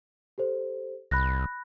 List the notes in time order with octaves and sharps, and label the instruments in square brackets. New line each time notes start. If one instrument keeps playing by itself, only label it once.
[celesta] G4 A4 C5
[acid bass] C2 [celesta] B5 F#6 A#6